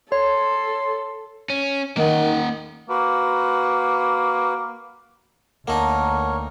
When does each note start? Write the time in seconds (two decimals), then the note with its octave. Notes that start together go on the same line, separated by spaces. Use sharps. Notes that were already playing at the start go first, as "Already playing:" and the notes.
0.12 A4 C#5 C6
1.50 C#4
1.97 D#3 A#3 F#5
2.89 A#3 F#4 B4
5.68 D2 A#3 D#4 A#4 C#5 F#5 A5 A#5